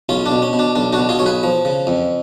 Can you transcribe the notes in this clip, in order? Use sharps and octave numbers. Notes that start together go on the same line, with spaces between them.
B1 C#4 F4
D4
B2
C#4
B2
D4
B1 D4
D4 F#4
B2
F4 G#4
B1 C#5
G#4 B4
F3
C#3
F2